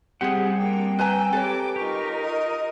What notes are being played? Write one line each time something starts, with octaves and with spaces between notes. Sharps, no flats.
G3 C4 G4 G#4 F#5
A#3 D4 G5
B4 G#5 A#5 E6 G6
G4 A4 B4 C#5 A#5 D6
D#4 F4 G4 A#4 C#6
D#5